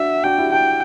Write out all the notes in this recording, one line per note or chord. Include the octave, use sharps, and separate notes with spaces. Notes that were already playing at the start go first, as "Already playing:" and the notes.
Already playing: D4 F#4 E5
D4 F#4 G5
E4 G4
D4 F#4 G5